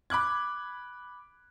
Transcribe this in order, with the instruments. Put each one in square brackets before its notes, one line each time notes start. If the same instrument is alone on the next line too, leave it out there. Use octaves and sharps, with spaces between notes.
[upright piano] B5 D6 F#6 G#6